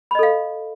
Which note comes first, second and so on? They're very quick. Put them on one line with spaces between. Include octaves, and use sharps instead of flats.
B5 D#5 A4 F5